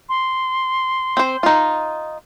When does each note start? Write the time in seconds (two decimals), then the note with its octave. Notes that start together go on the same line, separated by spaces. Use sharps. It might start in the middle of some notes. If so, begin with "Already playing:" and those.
0.09 C6
1.17 C4 C5
1.43 D#4 F4